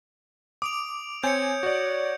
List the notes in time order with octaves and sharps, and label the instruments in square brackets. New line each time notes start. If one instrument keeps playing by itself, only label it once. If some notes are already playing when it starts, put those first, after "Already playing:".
[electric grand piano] D6 [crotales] D#6 D7 F7
[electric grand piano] C4 G#5 [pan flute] C#5 [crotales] G6 C#7
[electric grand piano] F#4 D5